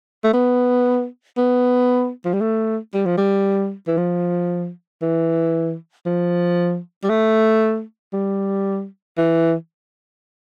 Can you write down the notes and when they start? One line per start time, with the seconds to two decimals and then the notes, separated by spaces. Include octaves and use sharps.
0.24 A3
0.33 B3
1.38 B3
2.25 F3
2.34 G3
2.41 A3
2.94 G3
3.06 F3
3.18 G3
3.87 E3
3.97 F3
5.02 E3
6.06 F3
7.04 G3
7.10 A3
8.13 G3
9.17 E3